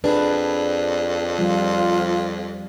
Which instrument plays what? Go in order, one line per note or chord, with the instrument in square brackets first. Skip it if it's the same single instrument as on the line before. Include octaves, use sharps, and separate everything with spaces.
[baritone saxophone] F2 [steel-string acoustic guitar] D4 G#4 [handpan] B4
[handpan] F3 G3 [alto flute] F4